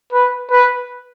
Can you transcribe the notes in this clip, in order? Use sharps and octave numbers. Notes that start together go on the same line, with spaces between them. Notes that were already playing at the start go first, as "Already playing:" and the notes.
B4
B4